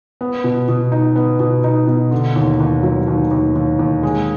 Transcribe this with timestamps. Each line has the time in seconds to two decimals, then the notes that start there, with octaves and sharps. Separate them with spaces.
0.21 B3
0.44 B2
0.68 B2
0.92 D#4
1.16 B3
1.39 B2
1.64 D#4
1.87 B2
2.11 D3
2.36 D#2
2.60 D#2
2.83 F#3
3.07 D#2
3.31 D#2
3.55 D#2
3.79 D#2
4.03 G#3